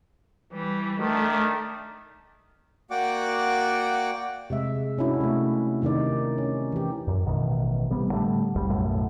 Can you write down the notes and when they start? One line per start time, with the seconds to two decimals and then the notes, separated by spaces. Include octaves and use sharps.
0.53 E3 G3
1.01 D#3 A3 D4
2.90 A#3 F#4 D5 F#5 G5 D6
4.50 C3 G#3 E5
4.98 C3 C#4 D4 E4 F#4
5.21 C3 A3
5.82 C3 D#3 D#4 D5
6.38 C#4
6.72 E3 G4
7.08 F#2
7.26 A1 B2 D#3
7.90 A1 C3 G3 B3
8.11 A2 D3 G3 A3
8.55 F#1 C2 G3
8.70 B1 F#2 A2